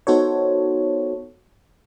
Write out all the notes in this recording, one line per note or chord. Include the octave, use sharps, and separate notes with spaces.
B3 D#4 F#4 A4 C5 C#5